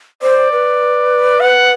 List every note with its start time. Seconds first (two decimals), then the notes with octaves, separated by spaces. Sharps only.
0.22 C5 D5
0.52 B4
1.40 F#5